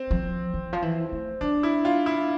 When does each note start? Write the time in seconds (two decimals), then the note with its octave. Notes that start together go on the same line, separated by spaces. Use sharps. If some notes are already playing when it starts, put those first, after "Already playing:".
Already playing: C4
0.11 F3
0.54 E3
0.73 F3
0.82 E3
1.12 A3
1.41 G3 D4
1.63 E4
1.85 F4
2.06 E4